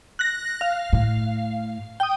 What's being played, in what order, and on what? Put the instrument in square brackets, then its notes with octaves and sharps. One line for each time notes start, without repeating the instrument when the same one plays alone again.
[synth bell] F#6 A#6
F5
[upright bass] A2
[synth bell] G5 D#6